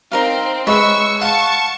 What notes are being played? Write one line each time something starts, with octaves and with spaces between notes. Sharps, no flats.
C4 D#4 A#4 F5
G#3 B4 C#5 E5 C#6 E6
F5 F#5 A5 C#6